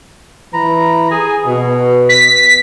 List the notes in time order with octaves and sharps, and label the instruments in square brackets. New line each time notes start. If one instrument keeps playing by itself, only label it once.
[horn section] E3 B4 A#5
G#4
B2
[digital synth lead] B6